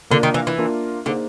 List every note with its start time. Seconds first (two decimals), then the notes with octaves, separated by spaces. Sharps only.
0.10 D3 A#3 D4 F4 A#4
0.23 D#3
0.34 E3
0.47 E3
0.58 A#3 D4 F4 A#4
1.06 D3 A#3 D#4 G#4 C5